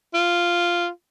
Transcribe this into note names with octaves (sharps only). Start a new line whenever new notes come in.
F4